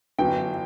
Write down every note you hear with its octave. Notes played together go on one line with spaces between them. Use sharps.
G1 F#2 E3 G5